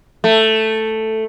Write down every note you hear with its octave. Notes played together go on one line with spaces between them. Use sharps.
A3